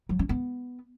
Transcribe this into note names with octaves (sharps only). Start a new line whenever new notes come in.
F#3
C#4
B3